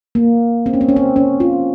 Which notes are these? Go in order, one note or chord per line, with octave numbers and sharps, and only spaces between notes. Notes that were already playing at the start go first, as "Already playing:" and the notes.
A#3
C4
C#4
C4
C#4
C4
C#4
F4